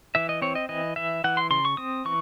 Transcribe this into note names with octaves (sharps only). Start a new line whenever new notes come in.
E3 E5
D#5
C4 C#5
D#5
E3 D#5
E3 E5
E3 F#5
C6
C#3 C6
C#6
C4 D#6
E3 C#6